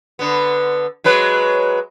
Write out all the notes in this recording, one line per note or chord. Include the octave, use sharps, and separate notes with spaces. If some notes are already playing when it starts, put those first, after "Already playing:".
D3 B3
F#3 G#3 B4